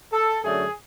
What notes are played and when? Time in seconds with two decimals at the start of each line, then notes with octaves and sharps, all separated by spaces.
0.13 A4
0.44 F#2 D3 F#3 A3 C#4 G#4